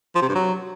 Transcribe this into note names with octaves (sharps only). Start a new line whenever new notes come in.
F3
C3
G2
F#3